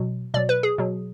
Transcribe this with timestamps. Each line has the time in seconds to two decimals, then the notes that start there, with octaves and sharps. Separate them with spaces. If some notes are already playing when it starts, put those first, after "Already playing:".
Already playing: B2 F#3
0.34 B2 F#3 D5
0.49 B4
0.63 G#4
0.78 B2 F#3